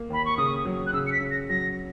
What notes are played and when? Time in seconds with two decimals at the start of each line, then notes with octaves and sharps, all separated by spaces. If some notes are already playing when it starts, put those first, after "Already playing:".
Already playing: A#3
0.10 D#2 B5
0.25 C#6
0.37 C#3 D#6
0.65 F#3
0.87 F#6
0.93 C#3 E6
1.07 C#7
1.12 B6
1.21 C#3
1.31 A#6
1.49 F#3 A#6